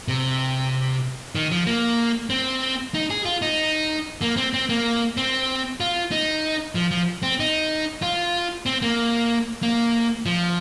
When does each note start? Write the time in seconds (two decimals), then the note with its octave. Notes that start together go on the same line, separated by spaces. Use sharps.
0.08 C3
1.35 D#3
1.51 F3
1.66 A#3
2.30 C4
2.94 D#4
3.10 G#4
3.25 F4
3.42 D#4
4.22 A#3
4.37 C4
4.53 C4
4.69 A#3
5.17 C4
5.80 F4
6.12 D#4
6.75 F3
6.91 F3
7.23 C4
7.40 D#4
8.02 F4
8.66 C4
8.82 A#3
9.62 A#3
10.26 F3